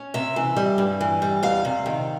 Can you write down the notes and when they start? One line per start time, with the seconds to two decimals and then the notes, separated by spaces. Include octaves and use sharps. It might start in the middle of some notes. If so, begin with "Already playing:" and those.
Already playing: C#4
0.14 C3 E5
0.36 E3
0.57 G3
0.78 G2
1.01 E3
1.22 G3
1.43 E2 F5
1.65 C3
1.86 D#3